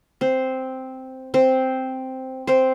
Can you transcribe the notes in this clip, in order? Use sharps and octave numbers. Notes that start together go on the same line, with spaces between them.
C4 C5
C4 C5
C4 C5